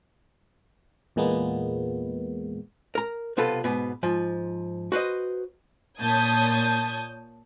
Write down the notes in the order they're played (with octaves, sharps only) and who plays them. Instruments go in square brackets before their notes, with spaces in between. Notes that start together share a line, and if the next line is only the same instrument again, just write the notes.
[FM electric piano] E2 A#2 G#3 A#3 B3
[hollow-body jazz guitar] A#4 A#5
B1 C3 B3 F4 A4 B4
G#2 B2 B3
G#2 F3
F#4 B4 C5 D#5
[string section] A#2 C#5 A5 D#6 G6 G#6